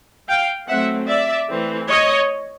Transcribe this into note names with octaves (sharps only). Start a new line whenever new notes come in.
F5 G5
F#3 A3 C4 E5 F#5
D5 E5
E3 A3 C4
C#5 D#5